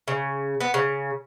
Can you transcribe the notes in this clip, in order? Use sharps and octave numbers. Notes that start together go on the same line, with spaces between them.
C#3
B3
C#3